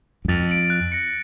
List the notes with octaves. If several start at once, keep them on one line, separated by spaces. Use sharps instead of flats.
F#2
F2 A6
D7 F#7
F#6
A#6 C#7